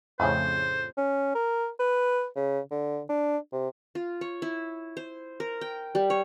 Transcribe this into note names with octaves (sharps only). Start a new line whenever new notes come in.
F2 A2 C#3 C5
C#4
A#4
B4
C#3
D3
D4
C3
F4
C#5
E4
C5
A#4
G5
G3
C#5